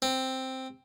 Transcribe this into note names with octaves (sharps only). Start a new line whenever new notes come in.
C4